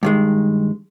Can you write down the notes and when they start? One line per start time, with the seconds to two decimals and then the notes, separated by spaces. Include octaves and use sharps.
0.03 G2 D#3 G#3